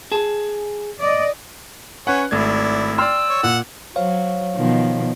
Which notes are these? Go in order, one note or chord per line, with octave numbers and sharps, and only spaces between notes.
G#4 A5
D5 D#5
C#4 B4 C#5 F#5 G#5 F#6
G#1 A3 E4 D5 G#6
D5 G5 C6 E6 F6
C#5
A#2 F#5
F#3 C5 C#5 F5
B2 D#3 F3